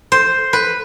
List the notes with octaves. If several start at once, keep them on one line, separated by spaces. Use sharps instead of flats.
C5
B4